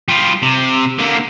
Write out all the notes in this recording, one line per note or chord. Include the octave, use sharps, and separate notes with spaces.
G3 F4
C3
D3 A#3